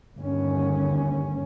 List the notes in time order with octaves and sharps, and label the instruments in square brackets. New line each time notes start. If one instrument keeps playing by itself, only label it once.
[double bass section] G1 D#2 C#4